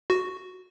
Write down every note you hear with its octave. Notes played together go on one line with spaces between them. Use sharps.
F#4